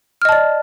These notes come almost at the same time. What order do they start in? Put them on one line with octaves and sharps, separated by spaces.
F6 D#5 A5 D5